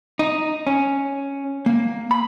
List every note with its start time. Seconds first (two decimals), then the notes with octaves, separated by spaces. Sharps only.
0.19 D#4
0.67 C#4
1.66 A#3
2.11 B5